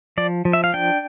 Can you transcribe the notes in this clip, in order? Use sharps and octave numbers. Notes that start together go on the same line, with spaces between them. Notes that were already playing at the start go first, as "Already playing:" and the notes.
F3 D5
F3
E5
F5
D4 G5